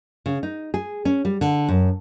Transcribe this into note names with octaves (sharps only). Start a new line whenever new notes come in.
C#3
D#4
G#4
C#4
G3
D3
F#2